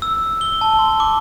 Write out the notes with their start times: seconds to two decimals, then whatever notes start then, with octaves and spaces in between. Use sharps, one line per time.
0.02 E6
0.41 G7
0.61 A5
0.79 C6
1.00 D6